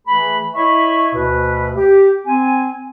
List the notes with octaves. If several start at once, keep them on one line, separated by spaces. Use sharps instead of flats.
E3 A3 G#4 B4 B5
E4 C#5 D#5 E5 B5 C#6
D2 B2 B4
G4
C4 G#5